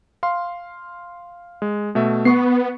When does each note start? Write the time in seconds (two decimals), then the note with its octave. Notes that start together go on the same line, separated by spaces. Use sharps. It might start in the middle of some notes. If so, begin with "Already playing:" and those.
0.23 F5 C6
1.62 G#3
1.95 B2 A3 E5
2.25 B3 C#6 C7